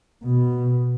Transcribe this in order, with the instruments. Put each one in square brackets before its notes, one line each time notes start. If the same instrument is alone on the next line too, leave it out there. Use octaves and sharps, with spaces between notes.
[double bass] B2